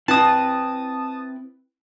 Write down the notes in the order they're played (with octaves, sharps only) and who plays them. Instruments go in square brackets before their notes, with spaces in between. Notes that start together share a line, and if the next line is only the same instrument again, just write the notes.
[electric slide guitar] C4 E4 B4 [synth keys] A5 D#6